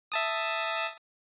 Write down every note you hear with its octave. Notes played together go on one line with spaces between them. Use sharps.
E5 A5 D#6